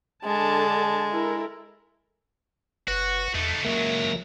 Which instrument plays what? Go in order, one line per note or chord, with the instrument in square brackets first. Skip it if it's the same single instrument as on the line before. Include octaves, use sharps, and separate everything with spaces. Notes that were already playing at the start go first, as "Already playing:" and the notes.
[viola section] D3 A5 [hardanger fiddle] G#3
[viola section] E4 A4 A#4
[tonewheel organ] F#1 B4 [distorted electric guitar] F#4
[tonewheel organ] E2 [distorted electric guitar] A3 D#4
[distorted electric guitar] C#2 F#3 [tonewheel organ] A#3 A#4 E5